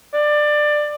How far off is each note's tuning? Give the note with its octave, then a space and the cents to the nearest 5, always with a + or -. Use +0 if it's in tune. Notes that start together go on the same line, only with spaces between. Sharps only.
D5 +20